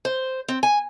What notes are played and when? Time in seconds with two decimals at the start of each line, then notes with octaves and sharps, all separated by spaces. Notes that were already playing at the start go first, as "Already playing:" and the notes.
0.05 C5
0.48 C4
0.63 G#5